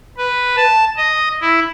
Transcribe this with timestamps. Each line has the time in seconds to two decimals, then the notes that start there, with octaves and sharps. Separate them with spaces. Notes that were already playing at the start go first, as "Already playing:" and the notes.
0.17 B4
0.57 A5
0.97 D#5
1.42 E4